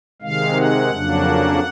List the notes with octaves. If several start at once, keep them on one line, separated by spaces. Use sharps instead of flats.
C3 D#3 G#3 F5
F#5
F2 C#3 F#3 A#3 D4